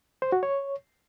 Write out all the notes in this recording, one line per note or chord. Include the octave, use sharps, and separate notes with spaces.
C5
F#4
C#5